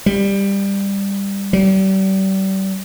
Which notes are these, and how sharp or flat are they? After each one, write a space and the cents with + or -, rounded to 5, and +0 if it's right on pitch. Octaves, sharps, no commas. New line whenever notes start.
G3 +15
G3 -35